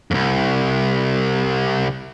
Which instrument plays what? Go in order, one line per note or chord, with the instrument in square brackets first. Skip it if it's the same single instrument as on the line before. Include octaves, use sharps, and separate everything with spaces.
[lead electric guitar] C2 F2